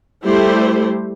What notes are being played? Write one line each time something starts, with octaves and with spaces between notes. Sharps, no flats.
G3 A3 E4 G4 C5